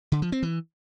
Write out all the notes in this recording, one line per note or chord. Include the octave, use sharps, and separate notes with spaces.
D3
F3
C4
E3